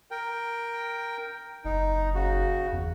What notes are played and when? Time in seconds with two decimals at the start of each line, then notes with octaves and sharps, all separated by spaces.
0.11 A#4 G5
1.65 F#1 D#4
2.15 C#3 F#4
2.72 E2